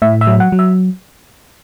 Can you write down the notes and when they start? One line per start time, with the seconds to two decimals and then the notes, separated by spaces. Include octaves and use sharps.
0.02 A2 E5
0.21 E5
0.27 F#3
0.40 F#5
0.52 F#3
0.59 E5